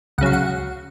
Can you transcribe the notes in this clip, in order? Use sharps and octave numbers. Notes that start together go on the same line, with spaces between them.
C#2 C#3 F#3 F5 F#5
F#5